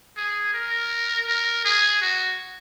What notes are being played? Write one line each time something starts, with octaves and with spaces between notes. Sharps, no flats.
G#4
A#4
A#4
G#4
F#4